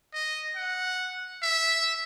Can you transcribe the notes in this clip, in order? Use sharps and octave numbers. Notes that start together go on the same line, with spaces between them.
D#5
F#5
E5